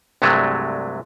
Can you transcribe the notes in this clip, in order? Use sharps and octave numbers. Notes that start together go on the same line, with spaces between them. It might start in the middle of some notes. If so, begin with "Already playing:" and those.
C2 G2 C3 F#3 G#3 A3